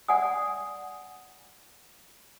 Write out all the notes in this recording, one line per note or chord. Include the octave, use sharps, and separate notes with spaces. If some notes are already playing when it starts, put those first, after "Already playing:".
D5 F#5 G#5 D#6